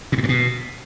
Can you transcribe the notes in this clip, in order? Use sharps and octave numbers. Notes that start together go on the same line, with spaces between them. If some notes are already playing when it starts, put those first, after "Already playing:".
A#2
A2
G2
B2